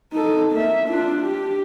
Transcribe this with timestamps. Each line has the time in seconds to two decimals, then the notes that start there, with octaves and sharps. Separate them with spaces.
0.13 D#4 A4
0.52 A#3 E5
0.87 D4 F4
1.22 G4